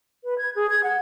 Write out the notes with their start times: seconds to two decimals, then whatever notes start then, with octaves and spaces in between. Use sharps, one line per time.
0.24 B4
0.38 G#6
0.56 G#4
0.70 G#6
0.84 F#5